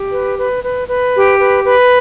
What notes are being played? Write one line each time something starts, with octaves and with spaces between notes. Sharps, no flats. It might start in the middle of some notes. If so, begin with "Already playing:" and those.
Already playing: G4
B4
B4
B4
B4
G4
B4
B4